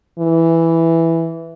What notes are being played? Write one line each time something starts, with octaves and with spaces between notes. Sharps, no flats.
E3